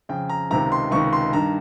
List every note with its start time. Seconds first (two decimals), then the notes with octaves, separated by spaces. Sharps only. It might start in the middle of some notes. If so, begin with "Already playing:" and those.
0.09 F2 C#3 G5
0.29 A#5
0.50 C#2 C3 D#3 A#5
0.72 C6
0.91 C#2 C3 D#3 C#6
1.13 C6
1.33 G2 D#3 A#5